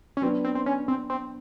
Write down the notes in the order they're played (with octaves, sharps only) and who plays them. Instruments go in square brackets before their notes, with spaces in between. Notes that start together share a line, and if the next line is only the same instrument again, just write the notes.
[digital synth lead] C#4
[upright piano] F#3 B3 D4 [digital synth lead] C4
[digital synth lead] C4
C4
C#4
C4
C4